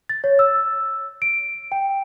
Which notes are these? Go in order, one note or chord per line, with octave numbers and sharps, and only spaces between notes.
A6
C#5
E6
D7
G5